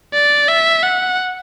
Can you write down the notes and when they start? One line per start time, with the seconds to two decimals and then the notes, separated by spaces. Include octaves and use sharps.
0.14 D5
0.48 E5
0.83 F#5